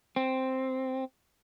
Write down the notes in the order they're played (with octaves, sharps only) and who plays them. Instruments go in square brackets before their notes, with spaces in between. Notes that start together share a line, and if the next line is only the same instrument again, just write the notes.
[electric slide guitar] C4